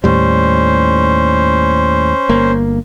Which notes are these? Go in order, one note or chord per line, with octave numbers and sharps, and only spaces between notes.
D#2 A2 G3 C#4 C5
G1 A#3